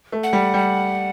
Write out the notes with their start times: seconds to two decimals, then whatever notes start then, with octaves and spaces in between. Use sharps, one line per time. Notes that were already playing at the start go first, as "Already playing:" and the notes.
0.12 A3
0.23 F#5
0.33 G3
0.54 G3